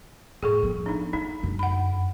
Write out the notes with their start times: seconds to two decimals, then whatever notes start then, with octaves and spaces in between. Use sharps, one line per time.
0.43 A2 G#4 A4 C#6
0.63 F3 B3
0.86 D4 D#4
1.13 D#4 E4
1.43 F#2 D3
1.59 F#5 B5